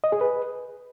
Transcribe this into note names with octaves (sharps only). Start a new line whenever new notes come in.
D#5
G#4
B4